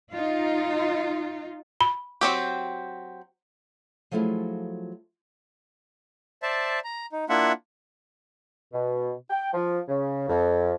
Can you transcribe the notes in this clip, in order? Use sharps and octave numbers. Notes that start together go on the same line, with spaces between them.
D#4 F4
B5
F#3 C4 G4
F3 F#3 A3 E4 F4 G#4
C5 D5 E5 A5
A#5
D#4
A#3 D4 E4 F4 E5 F#5
B2
G5
F3
C#3
F2